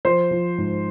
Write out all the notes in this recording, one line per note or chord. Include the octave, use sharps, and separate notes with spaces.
F3 C5
F3
G#2